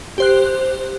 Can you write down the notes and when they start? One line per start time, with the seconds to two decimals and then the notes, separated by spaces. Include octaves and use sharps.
0.18 G4 C5 F#6